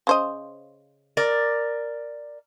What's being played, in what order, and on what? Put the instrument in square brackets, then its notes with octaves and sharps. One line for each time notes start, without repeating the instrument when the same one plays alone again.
[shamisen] C#3 C5 D#5
[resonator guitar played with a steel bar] A#4 D5